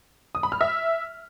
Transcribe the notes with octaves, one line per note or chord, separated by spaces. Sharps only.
D#6
B5
F6
E5